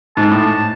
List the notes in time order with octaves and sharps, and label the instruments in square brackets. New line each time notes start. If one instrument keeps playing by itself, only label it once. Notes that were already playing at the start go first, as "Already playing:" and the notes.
[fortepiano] G#2 [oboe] A5
[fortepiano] A2